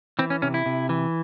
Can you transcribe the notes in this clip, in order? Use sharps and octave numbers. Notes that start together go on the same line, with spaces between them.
E3 C4
C#4
C3 C#4
E4
C3
E3